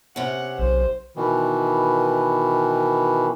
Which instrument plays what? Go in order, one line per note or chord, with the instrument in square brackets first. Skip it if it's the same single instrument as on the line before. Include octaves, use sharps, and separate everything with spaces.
[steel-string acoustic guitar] C3 C#4 [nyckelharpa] F#5
[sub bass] B1 [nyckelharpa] C5
[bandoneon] B2 D#3 E3